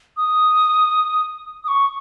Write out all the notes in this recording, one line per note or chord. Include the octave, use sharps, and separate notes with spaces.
D#6
D#6
C#6